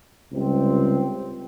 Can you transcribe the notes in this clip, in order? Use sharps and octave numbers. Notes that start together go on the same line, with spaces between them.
C#2 C3 G3 C4